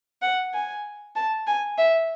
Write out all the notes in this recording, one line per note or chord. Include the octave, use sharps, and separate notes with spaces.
F#5
G#5
A5
G#5
E5